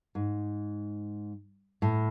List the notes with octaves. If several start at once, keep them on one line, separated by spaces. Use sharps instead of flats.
G#2
A2